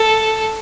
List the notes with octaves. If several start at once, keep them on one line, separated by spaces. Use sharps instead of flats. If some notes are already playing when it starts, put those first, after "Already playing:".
Already playing: A4